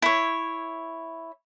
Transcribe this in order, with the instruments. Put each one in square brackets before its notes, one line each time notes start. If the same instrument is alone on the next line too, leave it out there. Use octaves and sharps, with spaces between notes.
[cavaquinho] E4 C#5